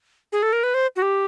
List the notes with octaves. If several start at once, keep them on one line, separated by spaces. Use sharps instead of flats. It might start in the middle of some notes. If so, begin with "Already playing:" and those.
G#4
A4
A#4
B4
C5
F#4
G4